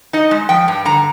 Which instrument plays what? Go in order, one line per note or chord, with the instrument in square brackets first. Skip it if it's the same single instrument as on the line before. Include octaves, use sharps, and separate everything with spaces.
[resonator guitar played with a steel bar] D#4 D#5
G#3
F3 G5
G2
D3 A#5